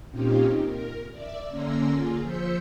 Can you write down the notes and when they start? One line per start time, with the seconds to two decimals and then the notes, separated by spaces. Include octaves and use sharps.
0.11 A#2 C4 C#4 D#4 F4 G4
0.63 A#4
1.11 D5 E5
1.48 D3 A#3 C#4 A#5 C6 E6
1.90 F4 G#4
2.22 F3 C5 E6 G6 B6 C#7